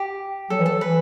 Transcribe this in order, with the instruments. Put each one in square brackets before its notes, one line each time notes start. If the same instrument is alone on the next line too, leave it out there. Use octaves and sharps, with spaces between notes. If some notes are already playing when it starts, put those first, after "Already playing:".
Already playing: [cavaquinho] G4
[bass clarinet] F#3 [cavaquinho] A4
[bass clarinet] E3
[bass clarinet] F#3 [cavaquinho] A4
[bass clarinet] E3 [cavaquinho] B4